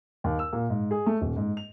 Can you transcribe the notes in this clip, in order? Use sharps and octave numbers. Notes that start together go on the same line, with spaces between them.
D#2
E6
A#2
G#2
G#4
A3
D#1
G#2
F7